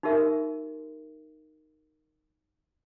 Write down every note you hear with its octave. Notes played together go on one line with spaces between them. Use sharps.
D#4 F#4 G4 A#4 E5